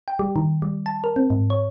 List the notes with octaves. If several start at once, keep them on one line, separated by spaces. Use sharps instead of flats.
G5
G3
D#3
G3
A5
A#4
C4
G#2
C#5